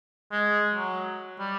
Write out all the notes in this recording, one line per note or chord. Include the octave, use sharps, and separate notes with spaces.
G#3
F#3
G3